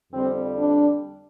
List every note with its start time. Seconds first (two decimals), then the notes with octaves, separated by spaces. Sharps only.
0.13 F2 D3 G3 C4
0.58 D4